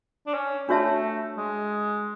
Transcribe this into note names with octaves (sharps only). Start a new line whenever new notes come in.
D4
C#4
A3 D4 F#4 C#5 E5 A5
G#3